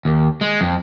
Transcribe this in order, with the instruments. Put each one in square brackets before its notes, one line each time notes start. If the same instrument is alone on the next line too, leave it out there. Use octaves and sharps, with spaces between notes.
[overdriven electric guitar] D#2
G#3
F2